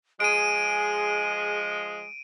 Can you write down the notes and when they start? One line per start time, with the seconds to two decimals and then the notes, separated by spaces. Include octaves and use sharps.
0.20 F3 G#3 G#4 D7 D#7